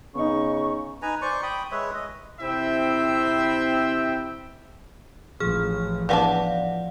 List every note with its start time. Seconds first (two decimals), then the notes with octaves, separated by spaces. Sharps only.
0.15 C#3 B3 D#4 C#6
1.02 D#4 B4 G#5 A#5
1.22 C5 D5 C#6
1.43 G5 B5 D#6
1.72 G#3 B4 C#5 E5
1.94 D#5
2.41 C3 C4 E4 E5 G5
5.40 A1 F3 G#4 F6
6.09 E3 B3 D4 D5 F5 F#5